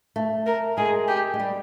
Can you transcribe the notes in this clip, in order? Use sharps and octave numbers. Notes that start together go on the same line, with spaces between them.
A3
A#4
G#3 G#4
G4
G#3
G3